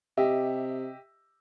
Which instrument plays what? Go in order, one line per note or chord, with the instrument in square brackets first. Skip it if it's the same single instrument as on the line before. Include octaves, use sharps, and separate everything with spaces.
[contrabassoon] C3 [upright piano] G4 D#5 E5